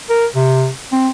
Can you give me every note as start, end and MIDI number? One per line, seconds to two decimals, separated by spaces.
0.10 0.26 70
0.35 0.70 48
0.92 1.09 60